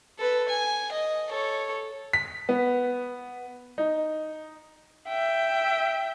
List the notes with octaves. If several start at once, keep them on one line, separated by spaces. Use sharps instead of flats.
A4 B4
G#5
D#5
A4 C#5
B6
B3
D#4
E5 G5